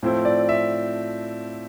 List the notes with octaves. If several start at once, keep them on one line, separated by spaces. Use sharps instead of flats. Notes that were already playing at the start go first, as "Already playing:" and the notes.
A2 F3 C4 E4
D5
E5